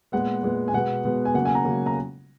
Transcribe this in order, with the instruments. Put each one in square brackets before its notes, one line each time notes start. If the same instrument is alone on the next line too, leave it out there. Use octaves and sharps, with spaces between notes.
[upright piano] A#2 G#3 B3 F#5
A#2 G#3 B3
G#5
B2 G#3 B3 F#5
B2 G#3 B3
G#5
C#3 F#3 A#3 F#5
G#5
A#5
C#3 F#3 A#3
A#5